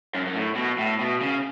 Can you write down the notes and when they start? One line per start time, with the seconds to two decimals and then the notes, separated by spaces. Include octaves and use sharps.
0.15 F#2
0.26 F#2
0.35 A2
0.56 B2
0.79 A2
0.99 B2
1.21 C#3